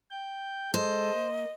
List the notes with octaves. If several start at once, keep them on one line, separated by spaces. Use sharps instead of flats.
G5 G6
G#3 A4 C5 D#5
A#3